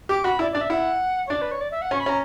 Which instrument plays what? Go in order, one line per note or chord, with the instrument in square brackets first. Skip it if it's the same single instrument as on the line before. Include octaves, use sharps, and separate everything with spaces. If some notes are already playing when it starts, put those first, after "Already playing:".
[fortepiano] G4 [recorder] D6
[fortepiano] F#4 [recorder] B5
[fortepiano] E4 [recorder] D5
[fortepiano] D4 [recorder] D5
[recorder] E5
[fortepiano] E4 [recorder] F#5
[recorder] C#5
[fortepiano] D4 [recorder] D5
[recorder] B4
C#5
D5
E5
F#5
[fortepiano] C#4 [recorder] C#6
[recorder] B5
[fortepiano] C#4 [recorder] A#5